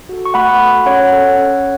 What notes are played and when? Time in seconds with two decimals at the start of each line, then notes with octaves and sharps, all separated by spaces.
0.09 F#4 A4
0.25 C#6
0.34 A3 F#5 B5
0.60 F#4 A4
0.86 C#4 C#5 F#5
1.12 A4
1.37 C#4